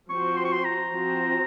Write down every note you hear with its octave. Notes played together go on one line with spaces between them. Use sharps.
F3 C4 F#4 C5 C#6
C6
C#6
C6
A#5
F3 C4 F#4 C5